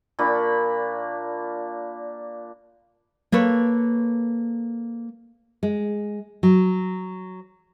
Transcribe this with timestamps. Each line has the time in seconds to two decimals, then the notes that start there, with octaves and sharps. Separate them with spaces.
0.19 A#2 D4 B5 C#6
3.32 A#3 A4 B4 C#5
5.63 G#3
6.43 F#3